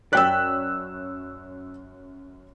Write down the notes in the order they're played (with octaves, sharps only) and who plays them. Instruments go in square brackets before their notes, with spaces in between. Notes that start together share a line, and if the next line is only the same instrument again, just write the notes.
[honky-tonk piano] F#2 C#5 B6 [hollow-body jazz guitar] D5 G5 [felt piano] E6 F#6